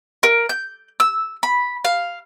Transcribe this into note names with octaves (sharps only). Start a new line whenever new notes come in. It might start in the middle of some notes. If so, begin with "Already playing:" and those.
A#4
G6
E6
B5
F5